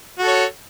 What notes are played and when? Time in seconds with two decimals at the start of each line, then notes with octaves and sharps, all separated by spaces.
0.19 F#4
0.23 A4
0.27 C#5